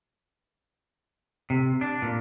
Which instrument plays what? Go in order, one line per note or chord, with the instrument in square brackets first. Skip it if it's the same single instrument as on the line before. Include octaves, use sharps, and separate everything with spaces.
[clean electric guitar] C3
D4
A#2